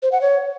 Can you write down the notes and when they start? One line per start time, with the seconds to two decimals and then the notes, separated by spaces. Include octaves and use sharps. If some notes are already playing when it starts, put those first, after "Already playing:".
0.03 C5
0.12 F#5
0.21 C#5